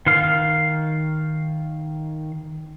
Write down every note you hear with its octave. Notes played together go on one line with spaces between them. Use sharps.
D#3 F5